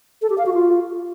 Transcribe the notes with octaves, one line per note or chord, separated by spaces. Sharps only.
A4
G4
F5
F#4
F4